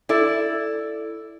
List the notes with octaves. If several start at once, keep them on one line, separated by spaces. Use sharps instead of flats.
E4 A4 D5